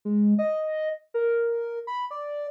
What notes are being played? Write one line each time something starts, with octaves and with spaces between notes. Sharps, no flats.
G#3
D#5
A#4
B5
D5